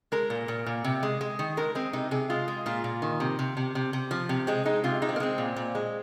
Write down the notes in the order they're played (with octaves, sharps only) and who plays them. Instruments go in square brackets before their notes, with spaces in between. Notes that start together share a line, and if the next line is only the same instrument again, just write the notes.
[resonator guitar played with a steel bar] G#3 A#4
A#2
A#2
A#2
C3
G#3
G#3
D#3
G#3 A#4
G#3 C4
C3 D#4
C3 G#4
G#3 F4
G#3
A#2 F4
A#2
D#3
C3
C3
C3
C3
C3
F3
C3
G#3 C4
G#3 D#4
C3 F4
G#3 D#4
C4
A#3
G#3 C4
A#2
A#2
G#3